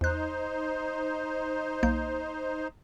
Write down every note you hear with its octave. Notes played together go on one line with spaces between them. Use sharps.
E2 D#4 C5 F#6
B1 A#3 G6